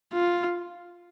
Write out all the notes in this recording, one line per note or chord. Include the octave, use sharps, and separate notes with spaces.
F4